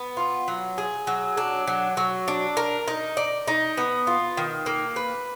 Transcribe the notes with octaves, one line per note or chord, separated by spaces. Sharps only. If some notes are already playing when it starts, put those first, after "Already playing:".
Already playing: B3
F4
F#3
G#4
F#3
D4
F#3
F#3
D4
A#4
D#4
D5
D#4
B3
F4
D#3
A#3
B4